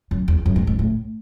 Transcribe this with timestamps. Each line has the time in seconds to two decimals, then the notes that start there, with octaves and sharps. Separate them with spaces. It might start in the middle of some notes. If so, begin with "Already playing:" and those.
0.11 F#2
0.28 E2
0.46 F#2
0.56 G#2
0.67 G#2
0.79 A2